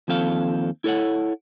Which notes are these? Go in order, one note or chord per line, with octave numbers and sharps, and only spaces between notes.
D#2 F3 C4 A4 F5
E4 A4 C#5 F#5